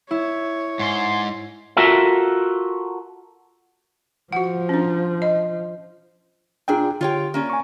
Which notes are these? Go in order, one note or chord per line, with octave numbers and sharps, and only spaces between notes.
E4 C#5
G#2 G#5 C6
F4 F#4 A4 A#4 E5
F3 F#4 F#5
C#4 D4
D#5
A#2 D4 F4 G#4 G5
D3 F4 G4 C#5 G5
A#3 C#4 D5
G#5 C#6